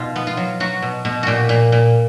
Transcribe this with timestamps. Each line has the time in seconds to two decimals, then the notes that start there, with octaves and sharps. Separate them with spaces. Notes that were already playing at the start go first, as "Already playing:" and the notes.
Already playing: B2 D#4 F4
0.16 B3
0.27 F4
0.37 F#3
0.60 F#3 F#4
0.82 B2
1.05 B2
1.23 A#2 F#4 G4
1.49 A#2
1.72 A#2